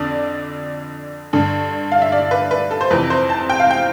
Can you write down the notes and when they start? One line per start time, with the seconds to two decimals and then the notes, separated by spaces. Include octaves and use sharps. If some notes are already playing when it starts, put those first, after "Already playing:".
Already playing: F2 D3 D5
1.33 G2 D3
1.92 F5
2.02 E5
2.12 D5
2.31 B4
2.51 B4
2.71 A4
2.81 C5
2.91 F2 C3 E3 B4
3.10 C5
3.30 A5
3.50 G5
3.60 F5
3.71 G5